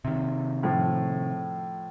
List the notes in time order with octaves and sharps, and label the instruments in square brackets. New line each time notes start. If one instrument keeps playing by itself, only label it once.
[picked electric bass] C3 D#3
[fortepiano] A2 F3